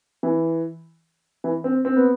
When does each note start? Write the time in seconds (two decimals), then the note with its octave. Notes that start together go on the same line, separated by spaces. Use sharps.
0.23 E3
1.44 E3
1.64 C4
1.85 C4
1.96 B3